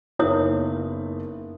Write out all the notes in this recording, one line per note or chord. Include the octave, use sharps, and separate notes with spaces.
F#1 A#3 B3 D#4 E4 C#5 D#6